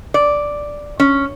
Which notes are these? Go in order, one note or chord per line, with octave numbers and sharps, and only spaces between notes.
D5
C#4